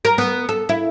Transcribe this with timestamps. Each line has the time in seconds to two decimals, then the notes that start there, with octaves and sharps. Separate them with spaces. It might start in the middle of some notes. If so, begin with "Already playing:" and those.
0.05 A#4
0.18 B3
0.49 A4
0.69 E4